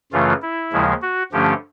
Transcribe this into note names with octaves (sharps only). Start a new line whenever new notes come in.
F#2 C#3 E3 A3 F4
E4
D#2 C#3 F3 G#3
F#4
G2 D3 F3 A3 C#4 G4